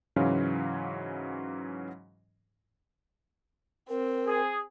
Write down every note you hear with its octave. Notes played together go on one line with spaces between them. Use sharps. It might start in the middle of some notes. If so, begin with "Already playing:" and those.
G#2 C#3 E3 F#3 C#4 F5
C4 A#4
G#4